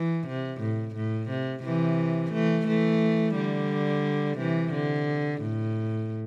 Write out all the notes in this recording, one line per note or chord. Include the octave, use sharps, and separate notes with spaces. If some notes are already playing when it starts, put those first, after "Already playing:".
Already playing: E3
C3
A2
A2
C3
C3 E3
E3 A3
E3 A3
D3 G3
C3 E3
D3
A2